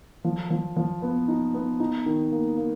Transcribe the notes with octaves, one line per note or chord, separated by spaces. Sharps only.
F3
F3
F3
B3
D#4
B3
D#4
D#3
A#3
A#3